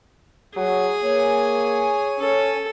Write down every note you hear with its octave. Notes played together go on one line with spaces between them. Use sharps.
F#3 G#4
A#3 C#5 G#5
C#4 A4